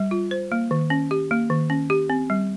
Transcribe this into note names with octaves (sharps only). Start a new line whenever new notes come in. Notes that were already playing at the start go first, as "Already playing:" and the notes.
Already playing: G3
F4
C5
A#3
D#3
C#4
G4
A#3
D#3
C#4
G4
C4
G3